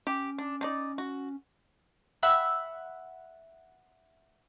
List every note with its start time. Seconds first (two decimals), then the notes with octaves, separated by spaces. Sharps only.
0.07 C#4 G4
0.38 D4
0.61 D4 D#4 D5
0.98 F#4
2.23 E5 F#5 B5 E6